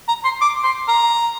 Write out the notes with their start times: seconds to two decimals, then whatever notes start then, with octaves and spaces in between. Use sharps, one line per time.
0.08 A#5
0.24 C6
0.41 D6
0.64 C6
0.88 A#5